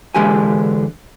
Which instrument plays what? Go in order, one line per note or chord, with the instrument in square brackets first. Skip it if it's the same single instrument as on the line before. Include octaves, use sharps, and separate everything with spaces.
[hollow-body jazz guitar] D3 E3 G#3 G4 B4 G#5